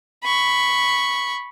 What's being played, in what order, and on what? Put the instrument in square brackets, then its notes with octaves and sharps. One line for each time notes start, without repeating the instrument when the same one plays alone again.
[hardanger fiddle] B5 C#6